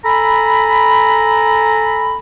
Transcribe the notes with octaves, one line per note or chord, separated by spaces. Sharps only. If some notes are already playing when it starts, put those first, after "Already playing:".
A4 G#5 A#5 B5